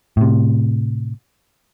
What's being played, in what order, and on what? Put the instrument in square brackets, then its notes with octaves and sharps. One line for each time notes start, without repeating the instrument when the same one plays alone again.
[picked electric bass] A2 C3